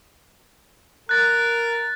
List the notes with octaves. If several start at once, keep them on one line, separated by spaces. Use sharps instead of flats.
A#4 F#6 A6